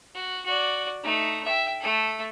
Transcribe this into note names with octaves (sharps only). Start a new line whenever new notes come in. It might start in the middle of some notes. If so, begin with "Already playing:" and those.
F#4
F#4 D5
A3 D#4
E5 G5
A3 A4